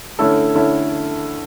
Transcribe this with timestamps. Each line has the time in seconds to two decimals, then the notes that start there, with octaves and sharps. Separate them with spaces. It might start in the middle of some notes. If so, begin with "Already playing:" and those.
0.19 D3 A3 C#4 E4 A4
0.55 D3 A3 C#4 E4 A4